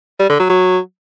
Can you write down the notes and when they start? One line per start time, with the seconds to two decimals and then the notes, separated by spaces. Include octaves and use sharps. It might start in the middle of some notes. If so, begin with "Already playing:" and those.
0.19 G3
0.29 D3
0.39 F#3
0.49 F#3